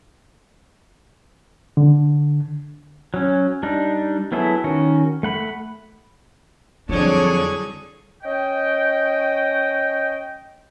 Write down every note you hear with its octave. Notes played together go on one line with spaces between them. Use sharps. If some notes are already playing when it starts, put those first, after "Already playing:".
D3
F#3 C#4
G3 D4 D#4
F#3 B3 E4 G#4 A4
D#3 C#4 F#4
A3 F#5 B5
F2 D3 F#3 G3 D4 E4 G#4 C#5
C#4 D#5 G5